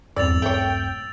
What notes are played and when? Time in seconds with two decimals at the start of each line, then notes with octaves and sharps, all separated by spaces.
0.16 D#1 E2 G2 C4 D5 E6 A6 F7
0.42 A3 C#5 G5